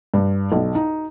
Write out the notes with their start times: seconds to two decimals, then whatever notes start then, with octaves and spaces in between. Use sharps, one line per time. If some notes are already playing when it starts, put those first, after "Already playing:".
0.14 G2
0.52 B1
0.75 D#4